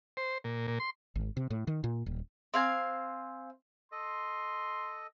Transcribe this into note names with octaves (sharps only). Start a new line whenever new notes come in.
C5
A#2
A#2
C6
G#1
C3
A2
D#3
A#2
D#1
C4 F5 G#5
A4 D#5 C6